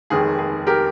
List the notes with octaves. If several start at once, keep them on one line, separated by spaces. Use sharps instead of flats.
F1 D#2 D#3 G#3 G#4
G#4
G4 A#4